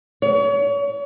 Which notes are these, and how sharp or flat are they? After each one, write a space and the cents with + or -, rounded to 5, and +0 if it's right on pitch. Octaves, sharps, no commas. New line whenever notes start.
C#5 +35